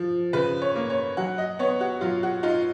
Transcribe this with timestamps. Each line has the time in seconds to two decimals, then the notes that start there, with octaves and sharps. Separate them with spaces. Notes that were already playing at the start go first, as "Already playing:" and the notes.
Already playing: F3
0.33 C#3 B4
0.62 C#5
0.75 A#3
0.90 C#5
1.17 F#3 F#5
1.38 D#5
1.59 B3 C#5
1.81 F#4
2.01 F#3 F4
2.23 F#4
2.43 D#4 F4